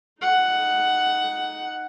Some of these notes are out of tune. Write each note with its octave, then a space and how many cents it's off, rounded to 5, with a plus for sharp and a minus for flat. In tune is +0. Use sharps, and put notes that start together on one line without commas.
D#4 +0 F#5 +5